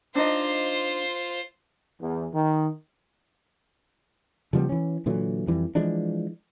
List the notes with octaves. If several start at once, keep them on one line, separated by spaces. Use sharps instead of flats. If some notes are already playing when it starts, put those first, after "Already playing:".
D4 D#4 F4 C5 D#5
E2
D#3
C#3 F3 G3 B3
E3 C#4
A#2 D3 E3 F#3
F2 E3 G3
E3 F3 G#3 D4